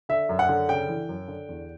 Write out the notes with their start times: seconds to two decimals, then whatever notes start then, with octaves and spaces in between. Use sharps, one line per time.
0.09 D3 E5
0.29 F#2
0.39 F#5
0.49 D3
0.69 C#3 G5
0.88 E3
1.09 F#2
1.28 D3
1.49 E2